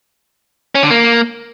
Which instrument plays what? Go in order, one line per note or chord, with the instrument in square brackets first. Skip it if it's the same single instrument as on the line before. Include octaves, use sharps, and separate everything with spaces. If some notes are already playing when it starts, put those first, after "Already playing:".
[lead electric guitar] C#4
D3
A#3